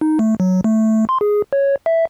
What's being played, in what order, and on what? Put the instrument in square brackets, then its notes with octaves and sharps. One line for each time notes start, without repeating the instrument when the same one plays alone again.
[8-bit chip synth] D#4
A3
F#3
A3
C6
G#4
C#5
E5